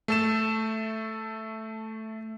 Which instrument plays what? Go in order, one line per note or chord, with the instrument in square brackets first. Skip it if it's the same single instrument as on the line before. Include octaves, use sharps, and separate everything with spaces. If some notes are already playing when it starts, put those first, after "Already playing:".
[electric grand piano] A3 A4 E7